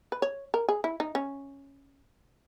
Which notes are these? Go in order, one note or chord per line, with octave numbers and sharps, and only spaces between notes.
B4
C#5
A#4
G#4
E4
D#4
C#4